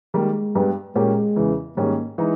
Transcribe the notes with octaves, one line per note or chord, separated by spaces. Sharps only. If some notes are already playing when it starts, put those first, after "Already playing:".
D#3 G3 G#3 A#3
G2 G3 B3
A#2 G#3 A#3 C#4 G4
E2 C#3 E3
G#2 D#3 G3 A#3 C#4
E3 G#3 D#4